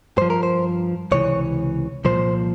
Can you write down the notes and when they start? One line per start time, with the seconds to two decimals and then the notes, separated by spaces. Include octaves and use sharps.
0.18 G2 F3 C5
0.30 A#4
0.43 C5
1.12 C#2 C3 E3 C#5
2.05 C2 A#2 F3 C5